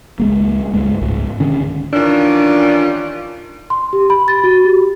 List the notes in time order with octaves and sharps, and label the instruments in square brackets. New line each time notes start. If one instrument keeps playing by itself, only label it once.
[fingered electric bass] C#2 G#3 A#3
C#2 G2 G#3 A3
C#2 G#2
D3 D#3 C#4
[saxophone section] D#3 E3 G3 C#4 D4 F4
[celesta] C6
G4
B5
A6
F#4
G4